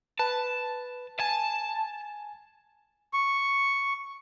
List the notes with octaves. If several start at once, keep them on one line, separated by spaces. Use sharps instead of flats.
B4 A5
G#5 A5
C#6